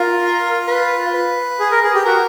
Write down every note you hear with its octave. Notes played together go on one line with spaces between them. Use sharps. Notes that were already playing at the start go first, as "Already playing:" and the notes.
Already playing: F4 A#4
B4
B4
G#4
A#4
G#4
G4
F#4 A#4